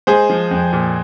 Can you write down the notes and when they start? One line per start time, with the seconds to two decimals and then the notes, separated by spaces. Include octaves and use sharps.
0.07 G#3 G#4 C5
0.30 F3
0.51 F2
0.73 A#2